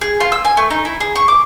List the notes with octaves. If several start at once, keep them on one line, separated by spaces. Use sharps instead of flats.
G#4
F4
E6
G#5
A3
D#4
E4
G#4
C#6
D6